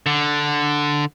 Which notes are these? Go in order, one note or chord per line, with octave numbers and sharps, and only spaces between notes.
D3